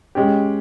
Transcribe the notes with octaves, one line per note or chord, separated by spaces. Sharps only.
G#3 C#4 G4